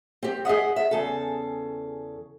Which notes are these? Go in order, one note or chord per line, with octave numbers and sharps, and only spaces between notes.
C4 G4
G#4 D#5 E5 F#5
E5
E2 C#3 A4